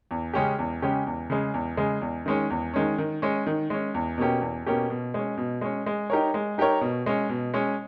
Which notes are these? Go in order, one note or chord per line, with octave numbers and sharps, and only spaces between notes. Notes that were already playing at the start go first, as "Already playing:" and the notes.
E2
C#3 G#3 C#4 G4
E2
C#3 G#3 C#4 G4
E2
C#3 G#3
E2
C#3 G#3
E2
D#3 G#3 C#4
E2
D#3 G#3 C#4
D#3
G#3 C#4
D#3
G#3 C#4
E2
B2 A#3 C#4 G4
E2
B2 A#3 C#4 G4
B2
G#3 C#4
B2
G#3 C#4
G#3
D#4 G4 A#4 C#5
G#3
D#4 G4 A#4 C#5
B2
G#3 C#4
B2
G#3 C#4